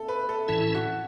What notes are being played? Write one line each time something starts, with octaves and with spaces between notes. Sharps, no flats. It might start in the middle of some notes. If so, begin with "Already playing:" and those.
Already playing: A4
B4
A4
A2 E3 C#4 E4 A4
F#4